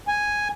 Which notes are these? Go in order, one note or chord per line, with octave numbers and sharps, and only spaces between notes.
G#5